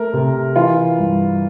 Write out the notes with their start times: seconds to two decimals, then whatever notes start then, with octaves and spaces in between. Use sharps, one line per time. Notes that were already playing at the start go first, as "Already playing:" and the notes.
Already playing: A3 A#4
0.13 C3
0.56 E3 F4
0.98 G2